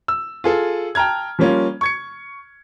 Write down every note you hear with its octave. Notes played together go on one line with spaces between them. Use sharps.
E6
F4 G#4 A4
G5 A5 A#5 F6 G#6
F3 G3 A#3 C#4 F4
C#6 G#6 C#7